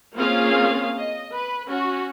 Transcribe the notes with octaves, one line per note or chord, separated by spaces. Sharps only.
A#3 C4 C#4 F4 G#4 F5
D#5
B4
C#4 F#4